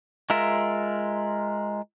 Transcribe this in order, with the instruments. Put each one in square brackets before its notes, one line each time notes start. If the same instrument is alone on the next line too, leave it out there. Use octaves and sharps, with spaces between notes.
[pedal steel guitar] G#3 F4 A#4 E5